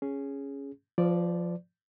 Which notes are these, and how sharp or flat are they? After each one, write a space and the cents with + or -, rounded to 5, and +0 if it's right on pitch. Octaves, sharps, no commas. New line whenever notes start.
C#4 +0 G#4 +0
F3 +0 B4 +45 D5 +0